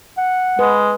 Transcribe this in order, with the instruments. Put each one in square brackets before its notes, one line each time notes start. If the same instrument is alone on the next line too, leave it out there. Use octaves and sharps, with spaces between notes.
[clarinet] F#5
[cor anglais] G#3 [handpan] B4